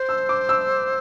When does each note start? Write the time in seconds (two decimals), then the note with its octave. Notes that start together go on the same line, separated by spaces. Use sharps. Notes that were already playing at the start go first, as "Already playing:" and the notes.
Already playing: C5
0.09 E6
0.29 D6
0.49 E6